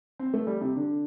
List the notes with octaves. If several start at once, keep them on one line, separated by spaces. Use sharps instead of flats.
C4
A3
G3
C3
D3